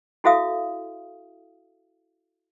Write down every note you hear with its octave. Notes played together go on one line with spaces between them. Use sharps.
E4 F#4 A4 E5 F5 D#6